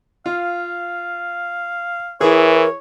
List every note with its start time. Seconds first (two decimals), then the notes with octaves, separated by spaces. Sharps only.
0.26 F4 F5
2.21 E3 E4 G#4 A#4 C#5